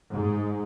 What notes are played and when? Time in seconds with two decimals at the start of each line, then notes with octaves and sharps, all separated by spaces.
0.11 G#2